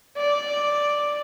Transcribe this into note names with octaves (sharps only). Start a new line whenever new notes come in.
D5